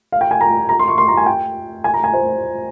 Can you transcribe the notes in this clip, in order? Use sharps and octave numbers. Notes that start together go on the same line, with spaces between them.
F5
G5
G#5
A#5
A#5
C6
C#6
C6
A#5
G#5
G5
G#5
A#5
G#5
C5